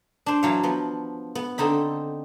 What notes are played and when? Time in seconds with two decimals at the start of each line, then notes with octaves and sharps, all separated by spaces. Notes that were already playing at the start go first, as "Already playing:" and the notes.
0.26 D4 C5
0.43 E3 F#3 F5
0.63 F3 B3
1.35 B3
1.58 D3 C4 D#4 B5